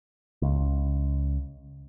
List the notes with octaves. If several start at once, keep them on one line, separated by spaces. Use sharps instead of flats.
C#2